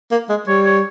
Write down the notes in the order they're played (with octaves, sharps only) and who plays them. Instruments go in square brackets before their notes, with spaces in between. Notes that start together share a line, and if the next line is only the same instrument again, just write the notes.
[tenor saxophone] A#3
G#3
[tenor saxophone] G3 [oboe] C#5
[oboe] C#5